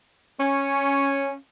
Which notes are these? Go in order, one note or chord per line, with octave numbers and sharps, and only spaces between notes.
C#4